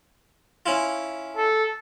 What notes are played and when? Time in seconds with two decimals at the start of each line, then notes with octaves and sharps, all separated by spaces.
0.66 C#4 E4 F4
1.37 A4